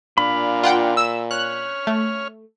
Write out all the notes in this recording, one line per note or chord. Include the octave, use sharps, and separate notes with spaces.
A#2 D4 F5 B5
F4 F#5 G5
E6
C#5 F6 F#6
A3